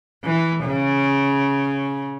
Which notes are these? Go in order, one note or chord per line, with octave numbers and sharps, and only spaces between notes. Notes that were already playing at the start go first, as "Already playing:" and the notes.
E3
C#3